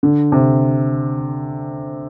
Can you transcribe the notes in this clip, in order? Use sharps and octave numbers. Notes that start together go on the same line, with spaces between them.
D3
C3